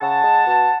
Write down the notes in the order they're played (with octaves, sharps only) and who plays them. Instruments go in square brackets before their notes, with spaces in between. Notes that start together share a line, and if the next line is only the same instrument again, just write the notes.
[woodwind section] C#3 F#5 A5
G#3
B2